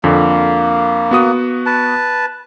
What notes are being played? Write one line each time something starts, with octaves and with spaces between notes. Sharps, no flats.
F2 D3 A#3
B3 F#4 D#6
B4 A5